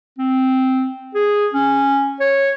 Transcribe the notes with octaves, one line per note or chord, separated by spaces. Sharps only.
C4
G#4
C#4
C#5